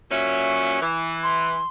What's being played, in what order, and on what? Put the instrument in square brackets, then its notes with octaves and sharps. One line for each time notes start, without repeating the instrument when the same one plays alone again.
[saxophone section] A#2 F#3 C#4 [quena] E5
[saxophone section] E3
[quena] C6